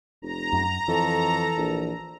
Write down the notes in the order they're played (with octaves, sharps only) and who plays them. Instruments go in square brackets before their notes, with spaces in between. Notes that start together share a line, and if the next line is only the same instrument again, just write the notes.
[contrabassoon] F1 [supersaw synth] A#5
[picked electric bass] F#2
[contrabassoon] F2 [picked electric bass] E3 [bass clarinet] A4
[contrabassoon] A#1